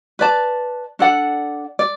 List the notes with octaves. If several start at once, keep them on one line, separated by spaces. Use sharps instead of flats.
B4 D5 A5
D4 A4 D5 F#5
D5